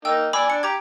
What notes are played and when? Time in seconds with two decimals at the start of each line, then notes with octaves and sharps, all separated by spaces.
0.05 A#3 D#4 G5 E6
0.33 D5 G#5 B5 D6 E6
0.50 D4 C#7
0.63 G4 A#5 D6 G#6